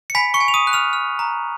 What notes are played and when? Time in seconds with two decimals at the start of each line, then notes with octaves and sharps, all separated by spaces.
0.10 C#7
0.15 G#5 B5 B6
0.34 C#6 C#7
0.41 G#5
0.48 F7
0.54 D#6 D#7
0.67 F#6
0.73 F6 F7
0.93 F6
1.19 A#5